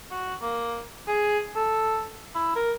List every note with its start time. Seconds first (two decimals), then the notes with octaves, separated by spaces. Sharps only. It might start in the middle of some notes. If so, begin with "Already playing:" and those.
0.11 F#4
0.41 A#3
1.07 G#4
1.55 A4
2.35 E4
2.56 A#4